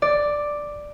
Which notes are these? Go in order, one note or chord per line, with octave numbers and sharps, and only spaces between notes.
D5